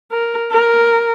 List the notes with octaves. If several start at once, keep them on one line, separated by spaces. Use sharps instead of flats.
A#4
A#4